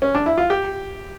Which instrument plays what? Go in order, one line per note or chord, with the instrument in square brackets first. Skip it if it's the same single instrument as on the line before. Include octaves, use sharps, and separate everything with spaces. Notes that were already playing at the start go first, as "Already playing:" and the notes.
[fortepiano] C#4
D4
E4
F4
G4